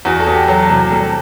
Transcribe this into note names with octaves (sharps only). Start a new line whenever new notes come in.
E2 F#4
A4
E2
G4
F#3 A4
C3
G3 A4